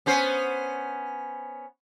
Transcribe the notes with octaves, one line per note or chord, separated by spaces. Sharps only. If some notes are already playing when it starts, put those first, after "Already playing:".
B3 C#4 C5